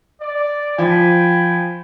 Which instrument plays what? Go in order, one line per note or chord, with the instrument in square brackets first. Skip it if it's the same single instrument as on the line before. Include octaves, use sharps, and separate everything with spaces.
[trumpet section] D5
[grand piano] F3 [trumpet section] G5 G#5 B5